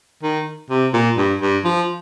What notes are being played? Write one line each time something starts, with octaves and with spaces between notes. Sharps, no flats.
D#3
C3
A#2
G2
G2
F3